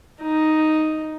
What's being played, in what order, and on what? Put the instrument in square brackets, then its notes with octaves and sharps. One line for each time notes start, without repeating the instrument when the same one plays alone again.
[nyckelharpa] D#4